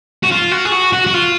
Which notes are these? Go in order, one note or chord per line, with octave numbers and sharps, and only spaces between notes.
F#4
F4
F#4
G#4
F#4
F#4
F#4
F4